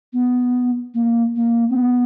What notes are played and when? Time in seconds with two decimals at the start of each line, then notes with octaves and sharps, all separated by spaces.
0.13 B3
0.94 A#3
1.36 A#3
1.70 C4
1.76 B3